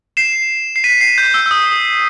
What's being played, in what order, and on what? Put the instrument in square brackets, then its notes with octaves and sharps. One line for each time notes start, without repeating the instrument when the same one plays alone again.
[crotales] C7 E7
C7
B6 D#7
C7
G6
E6
E6
D#6